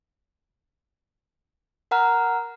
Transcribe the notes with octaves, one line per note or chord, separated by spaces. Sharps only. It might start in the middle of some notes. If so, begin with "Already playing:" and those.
A#4 F#5 A#5 F6